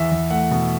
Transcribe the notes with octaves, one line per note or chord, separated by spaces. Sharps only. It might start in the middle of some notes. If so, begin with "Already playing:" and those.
Already playing: E2 E5
E2
A3 F#5
B2